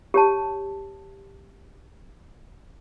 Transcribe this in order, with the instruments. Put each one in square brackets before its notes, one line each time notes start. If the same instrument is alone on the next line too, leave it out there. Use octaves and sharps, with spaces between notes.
[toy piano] G4 C#5 A5